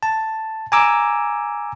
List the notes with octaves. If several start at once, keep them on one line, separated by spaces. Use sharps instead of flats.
A5
G#5 A#5 D6 E6